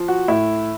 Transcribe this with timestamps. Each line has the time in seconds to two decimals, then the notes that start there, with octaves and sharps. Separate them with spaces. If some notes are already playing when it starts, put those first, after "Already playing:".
Already playing: F3
0.08 F#4
0.28 A2 E4